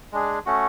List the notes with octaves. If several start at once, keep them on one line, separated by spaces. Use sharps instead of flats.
G#3 D4 G#4
A3 C#4 F#4